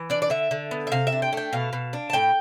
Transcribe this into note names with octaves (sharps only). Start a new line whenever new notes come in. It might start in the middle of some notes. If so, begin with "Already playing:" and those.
Already playing: E3
D4 D5
D5
D3 E5
D3
B3
E5
C3 F5
E5
D4
G5
A3 G5
B2 F5
B2
D4
A5
A2 G5